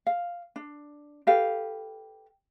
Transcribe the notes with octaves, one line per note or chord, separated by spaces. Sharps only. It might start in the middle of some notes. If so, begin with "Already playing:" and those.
F5
D4
G4 A4 B4 F5